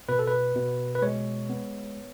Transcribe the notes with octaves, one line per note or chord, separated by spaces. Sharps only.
B2 B4
A4
B4
B2
B4
G#3 C#5
B3